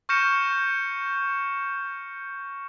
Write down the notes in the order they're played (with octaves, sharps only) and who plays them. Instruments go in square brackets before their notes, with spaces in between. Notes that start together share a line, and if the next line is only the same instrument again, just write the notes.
[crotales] C#6 F6 G6 A#6 C#7 E7